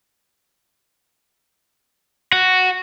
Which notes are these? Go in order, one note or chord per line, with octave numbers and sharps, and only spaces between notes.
F#4